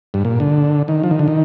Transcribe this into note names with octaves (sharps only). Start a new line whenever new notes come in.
G2
A#2
D3
D#3
F3
D#3
D3
D#3